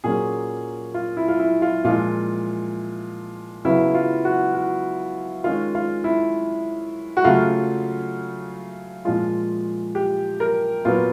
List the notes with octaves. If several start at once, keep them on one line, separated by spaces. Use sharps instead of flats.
A#2 F#3 A#3 C#4 G#4
F4
E4
F4
E4
F4
A#2 F3 G#3 F4
C#3 F#3 B3 E4
F4
F#4
F#4
D#3 G#3 C#4 F4
F4
E4
F#4
C#3 F#3 A3 F4
A#2 F3 G#3 F4
G4
A#4
A#2 F#3 B3 F4